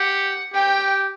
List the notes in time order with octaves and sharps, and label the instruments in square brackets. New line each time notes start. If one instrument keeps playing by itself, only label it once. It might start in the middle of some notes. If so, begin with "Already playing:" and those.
Already playing: [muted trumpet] G4 [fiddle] F#5
[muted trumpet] G4 [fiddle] G5